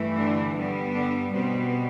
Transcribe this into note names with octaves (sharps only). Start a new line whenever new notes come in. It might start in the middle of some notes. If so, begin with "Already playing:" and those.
Already playing: G2 E3 A3
D3 D4
G2 D3 G3 B3
D3 D4
B2 G3 B3 C4